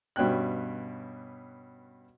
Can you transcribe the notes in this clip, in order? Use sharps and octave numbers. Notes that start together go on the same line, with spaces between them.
G2 B2 C#4 G5 F#6